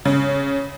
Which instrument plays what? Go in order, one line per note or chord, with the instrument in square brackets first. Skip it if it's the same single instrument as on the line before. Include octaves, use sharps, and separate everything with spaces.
[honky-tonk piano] C#3